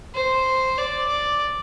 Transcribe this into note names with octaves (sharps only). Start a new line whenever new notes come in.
C5
D5
D5